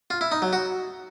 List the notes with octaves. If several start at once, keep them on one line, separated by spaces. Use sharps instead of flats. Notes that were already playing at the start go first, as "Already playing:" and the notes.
F4
E4
D#4
F#3
F#4